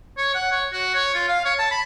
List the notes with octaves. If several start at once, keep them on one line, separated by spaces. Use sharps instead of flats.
C#5
F#5
C#5
F#4
C#5
F4
F5
C#5
A5
B5